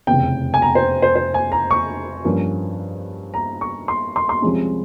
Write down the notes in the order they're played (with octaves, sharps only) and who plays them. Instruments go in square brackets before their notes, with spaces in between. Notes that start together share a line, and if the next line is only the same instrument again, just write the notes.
[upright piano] F1 E2 C#3 G5
G#5
A#5
C5
C5
C5
G#5
A#5
C#6
G2 F3 A#3 C#4
A#5
C#6
C6
C6
C6
C2 C3 F3 G#3 C#4